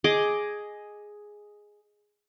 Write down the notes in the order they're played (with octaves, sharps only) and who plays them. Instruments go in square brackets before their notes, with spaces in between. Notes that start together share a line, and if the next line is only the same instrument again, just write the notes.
[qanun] G#4 D#5 D6